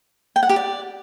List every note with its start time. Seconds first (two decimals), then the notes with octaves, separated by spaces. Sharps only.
0.36 G5
0.43 F#5
0.49 G4
0.56 D5